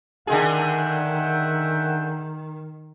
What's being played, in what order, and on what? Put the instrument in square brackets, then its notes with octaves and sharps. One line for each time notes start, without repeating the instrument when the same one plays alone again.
[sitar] D3 G#3 G#4 [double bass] D#3 [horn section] E5 F#5 G5